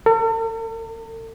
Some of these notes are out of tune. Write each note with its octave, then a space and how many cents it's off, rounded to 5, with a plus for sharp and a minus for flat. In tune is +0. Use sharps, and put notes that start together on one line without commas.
A4 +45